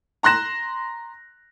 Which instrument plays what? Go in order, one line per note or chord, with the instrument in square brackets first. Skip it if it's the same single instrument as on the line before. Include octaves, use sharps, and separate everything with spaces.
[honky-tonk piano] A#5 C6 F#6 A#6 E7